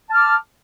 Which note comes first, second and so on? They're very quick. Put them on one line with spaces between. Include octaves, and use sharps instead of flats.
A5 F6 D6